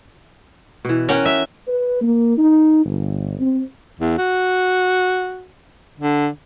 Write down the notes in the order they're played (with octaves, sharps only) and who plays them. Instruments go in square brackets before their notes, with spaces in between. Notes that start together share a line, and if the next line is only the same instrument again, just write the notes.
[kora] B2 E3
[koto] C#4 [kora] A#4 F#5 G5
[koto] E5
[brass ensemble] B4
A#3
D#4
G1
C4
[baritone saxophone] E2
F#4
D3